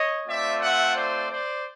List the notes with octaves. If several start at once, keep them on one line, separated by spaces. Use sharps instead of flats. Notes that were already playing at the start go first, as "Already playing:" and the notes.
Already playing: C#5 D#5
A3 C4 F4 D5 E5
E5 F#5
C5 D5
C5 D5